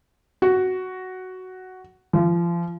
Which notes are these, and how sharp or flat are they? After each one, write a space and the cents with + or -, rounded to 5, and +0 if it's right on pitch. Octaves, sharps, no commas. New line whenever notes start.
F#4 +5
F3 -30